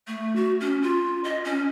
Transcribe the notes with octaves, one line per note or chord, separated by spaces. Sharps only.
A3
F#4
C#4
F4
D#5
C#4